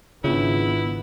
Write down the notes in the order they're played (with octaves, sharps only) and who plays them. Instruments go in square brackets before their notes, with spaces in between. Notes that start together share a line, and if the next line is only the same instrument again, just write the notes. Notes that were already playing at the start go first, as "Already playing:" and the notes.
[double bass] G#1 B3 [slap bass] C#3 [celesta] D4 F4 [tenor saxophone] E4